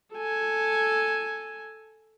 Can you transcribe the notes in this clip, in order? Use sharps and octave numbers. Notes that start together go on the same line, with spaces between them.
A4 G#5